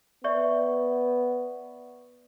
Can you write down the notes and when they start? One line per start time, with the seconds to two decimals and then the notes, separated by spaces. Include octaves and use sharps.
0.24 B3 D5 E5 C#6